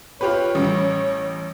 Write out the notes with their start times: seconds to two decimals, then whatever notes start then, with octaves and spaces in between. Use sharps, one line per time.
0.21 F4 G4 B4 C#5
0.55 A1 G3